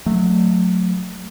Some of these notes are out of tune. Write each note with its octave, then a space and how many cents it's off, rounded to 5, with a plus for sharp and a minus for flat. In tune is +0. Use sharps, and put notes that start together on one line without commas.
F#3 -25 A3 +0